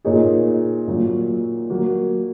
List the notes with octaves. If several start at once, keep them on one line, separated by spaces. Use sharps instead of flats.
A#2 A#3 D#4 G#4 C#5
A#2 F#3 A#3
F#3 A#3 F#4